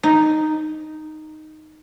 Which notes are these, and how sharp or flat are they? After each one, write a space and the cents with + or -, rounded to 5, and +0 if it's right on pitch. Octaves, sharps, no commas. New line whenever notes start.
D#4 -5